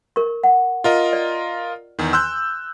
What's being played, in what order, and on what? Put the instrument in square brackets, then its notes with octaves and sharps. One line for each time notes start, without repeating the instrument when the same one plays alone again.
[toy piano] A#4 C#6
F#5
[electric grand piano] F4 A#4 D#5
[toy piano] D5
[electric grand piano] E2 D#3
[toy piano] G#5 C6 [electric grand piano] E6 F#6 G6